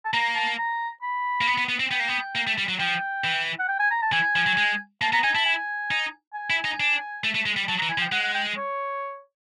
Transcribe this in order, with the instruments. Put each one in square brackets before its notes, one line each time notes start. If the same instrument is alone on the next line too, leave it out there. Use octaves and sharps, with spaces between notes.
[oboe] A5
[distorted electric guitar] A#3 [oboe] A#5
[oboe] A5
A#5
B5
[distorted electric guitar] A#3
B3
B3
B3
C4
[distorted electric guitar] B3 [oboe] G5
[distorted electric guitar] A#3
B3
A#3
A3
G3
F#3
[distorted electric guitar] F3 [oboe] G5
[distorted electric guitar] E3
[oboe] F#5
G5
G#5
A#5
A5
[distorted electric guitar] E3 [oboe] G#5
[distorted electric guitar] F3
F#3
G#3
[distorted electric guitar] A#3 [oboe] A5
[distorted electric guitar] B3 [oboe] A#5
[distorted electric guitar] D#4 [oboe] G#5
[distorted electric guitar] E4 [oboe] A5
[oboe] G#5
[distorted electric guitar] D#4
[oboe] G#5
[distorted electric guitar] E4
D#4
D4
A3
A3
G#3
G3
[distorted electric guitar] F#3 [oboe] A5
[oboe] A#5
[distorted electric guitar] E3
[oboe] G#5
[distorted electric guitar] F3
[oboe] G5
[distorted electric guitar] G#3 [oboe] F#5
[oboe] F#5
G5
C#5